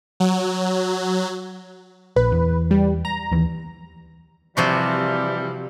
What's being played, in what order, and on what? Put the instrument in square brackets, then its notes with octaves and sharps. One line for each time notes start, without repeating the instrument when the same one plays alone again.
[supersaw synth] F#3
[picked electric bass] A#1 [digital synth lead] B4
[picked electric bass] E2
[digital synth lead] G3
A#5
[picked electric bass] D#2 E3
[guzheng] C3 F3 F#4 [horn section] E3 G3